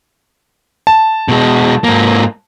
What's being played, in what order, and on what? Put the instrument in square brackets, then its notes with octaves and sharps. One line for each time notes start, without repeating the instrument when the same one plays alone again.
[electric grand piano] A5
[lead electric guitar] B2 G#3
G#2 A#3